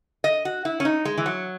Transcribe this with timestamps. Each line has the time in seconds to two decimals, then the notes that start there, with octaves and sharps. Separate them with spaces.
0.24 D#5
0.45 F#4
0.65 E4
0.80 C#4
0.85 D#4
1.05 G#3
1.18 E3
1.26 F#3